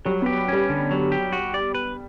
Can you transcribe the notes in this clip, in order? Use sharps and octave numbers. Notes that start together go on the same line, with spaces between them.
F#3 G3
B3 G4
G3 C#4
D3
F#3
G4
F#4
D5
B4